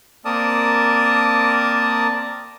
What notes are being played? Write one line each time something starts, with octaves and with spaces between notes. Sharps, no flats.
A#3 C4 A#4 D5 A5 D#6